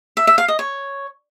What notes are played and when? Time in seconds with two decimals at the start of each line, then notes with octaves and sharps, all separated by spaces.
0.17 E5
0.27 E5
0.38 F5
0.48 D#5
0.59 C#5